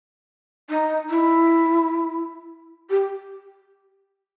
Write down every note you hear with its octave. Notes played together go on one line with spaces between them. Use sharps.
D#4
E4
G4